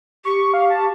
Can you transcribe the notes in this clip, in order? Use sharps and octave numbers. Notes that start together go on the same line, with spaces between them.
G4 C#6
F5
A5